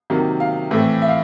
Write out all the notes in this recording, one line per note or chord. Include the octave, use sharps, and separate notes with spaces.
C3 D#3 F#3 A#3
F5
A2 E3 A3 C4
E5
F5